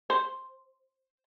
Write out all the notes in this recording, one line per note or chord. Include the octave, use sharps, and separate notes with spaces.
C5